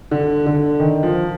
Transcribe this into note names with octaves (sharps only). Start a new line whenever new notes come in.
D3
D3
D#3
F3